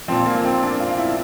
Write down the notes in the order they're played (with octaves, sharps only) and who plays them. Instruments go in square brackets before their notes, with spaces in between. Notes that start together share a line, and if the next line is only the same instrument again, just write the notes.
[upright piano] A#2 F3 C4
A#3
C4
D4
F4
E4